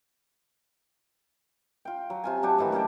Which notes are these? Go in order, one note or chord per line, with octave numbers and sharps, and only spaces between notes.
F4 G5
F#3
C3 F4 G#5
F#3 D4 F#4 G4
A2 D#3 E3 F#4
F#3 C#4 G4 G5